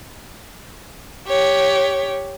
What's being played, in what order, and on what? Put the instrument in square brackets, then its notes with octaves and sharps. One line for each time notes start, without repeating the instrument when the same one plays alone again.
[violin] G4 C#5